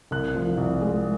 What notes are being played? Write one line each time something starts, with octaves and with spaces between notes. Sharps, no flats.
C2 F#6
F3
C2
G#3